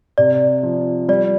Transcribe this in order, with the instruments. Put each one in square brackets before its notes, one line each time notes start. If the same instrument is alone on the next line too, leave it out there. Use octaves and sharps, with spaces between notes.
[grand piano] C3 [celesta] D5
[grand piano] F3
[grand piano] G3 [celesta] D5